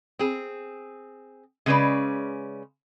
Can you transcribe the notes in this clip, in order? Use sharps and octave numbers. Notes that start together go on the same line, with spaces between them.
C4 G#4
C#3 G#3 C#4 B4 D5